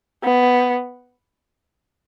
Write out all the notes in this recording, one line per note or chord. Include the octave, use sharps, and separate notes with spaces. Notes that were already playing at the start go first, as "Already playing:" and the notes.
B3